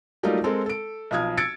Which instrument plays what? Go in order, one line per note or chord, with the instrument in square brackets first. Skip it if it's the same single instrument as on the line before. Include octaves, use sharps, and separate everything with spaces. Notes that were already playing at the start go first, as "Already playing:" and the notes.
[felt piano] F#3 G3 A3 A#3 D#4 F4
G#3 C4 A4 A#4
A4 D7
B1 F3 D#6 F6 G#6
E6 G#6 A6 C#7 D7